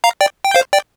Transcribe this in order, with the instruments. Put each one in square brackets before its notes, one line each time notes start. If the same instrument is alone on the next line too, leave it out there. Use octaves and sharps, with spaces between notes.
[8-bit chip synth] F5 A#5
D5 G5
G5
C5 F5
D5 G5